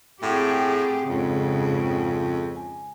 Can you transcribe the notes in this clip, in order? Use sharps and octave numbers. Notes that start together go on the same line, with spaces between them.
A2 C4 G4 G#4 F#5 G5
F2 G#2 C#3
G#5